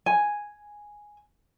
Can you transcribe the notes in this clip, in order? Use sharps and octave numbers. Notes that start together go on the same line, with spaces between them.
G#5